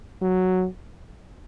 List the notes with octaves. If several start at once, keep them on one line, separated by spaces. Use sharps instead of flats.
F#3